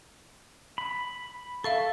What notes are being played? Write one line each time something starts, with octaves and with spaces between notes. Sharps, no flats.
B5
A4 E5 F5 C#6